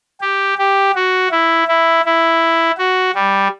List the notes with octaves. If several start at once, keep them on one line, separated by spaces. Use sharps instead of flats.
G4
G4
F#4
E4
E4
E4
F#4
G3